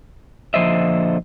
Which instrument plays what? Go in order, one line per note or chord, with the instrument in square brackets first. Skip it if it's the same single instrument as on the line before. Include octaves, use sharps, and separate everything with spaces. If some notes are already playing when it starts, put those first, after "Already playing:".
[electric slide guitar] A#2 D3 F3 C5 D#5 E5